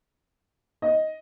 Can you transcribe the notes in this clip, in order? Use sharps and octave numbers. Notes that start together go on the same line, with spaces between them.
D#5